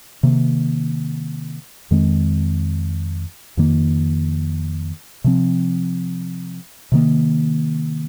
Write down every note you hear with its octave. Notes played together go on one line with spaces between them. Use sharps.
C3 D#3 A#3
F2 D#3 G#3 C4
F2 D#3 A#3
C3 F3 C4
C3 D#3 A#3